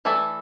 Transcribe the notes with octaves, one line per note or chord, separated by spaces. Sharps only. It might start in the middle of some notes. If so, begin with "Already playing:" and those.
E3 A3 E4 A4 D5